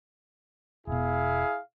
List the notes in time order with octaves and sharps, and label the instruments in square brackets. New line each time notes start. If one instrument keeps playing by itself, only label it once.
[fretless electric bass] E1 B2 [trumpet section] E4 G#4 F5